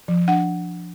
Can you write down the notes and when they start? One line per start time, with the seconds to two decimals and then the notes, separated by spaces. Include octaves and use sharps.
0.08 F3
0.28 D4 F#5